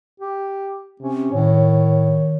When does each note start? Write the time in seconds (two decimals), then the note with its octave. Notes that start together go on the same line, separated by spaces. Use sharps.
0.20 G4
1.01 C3 C#4
1.33 A2 D#3 C#5